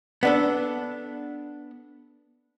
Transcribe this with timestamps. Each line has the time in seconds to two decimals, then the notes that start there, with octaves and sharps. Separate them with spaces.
0.23 B3 D4 A4